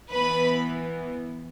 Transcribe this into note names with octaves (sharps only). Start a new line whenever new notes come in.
E3 B3 B4 B5